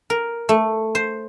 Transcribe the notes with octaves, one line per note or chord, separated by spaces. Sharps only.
A#4
A3
C5